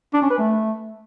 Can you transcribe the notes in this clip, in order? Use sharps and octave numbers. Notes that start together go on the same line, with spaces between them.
D4
C#4
B4
A3